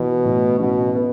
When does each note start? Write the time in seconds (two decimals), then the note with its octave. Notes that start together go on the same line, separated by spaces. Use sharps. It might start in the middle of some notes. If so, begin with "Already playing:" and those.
Already playing: B2 E3
0.25 A2
0.59 A1 B2
0.95 B3